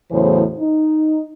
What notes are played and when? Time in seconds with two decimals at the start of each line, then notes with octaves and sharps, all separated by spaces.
0.11 E2 A2 C#3 E3 F#3 C5
0.60 D#4